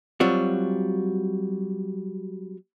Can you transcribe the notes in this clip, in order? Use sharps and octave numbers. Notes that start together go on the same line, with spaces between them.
F#3 G3 C4 F4 F#4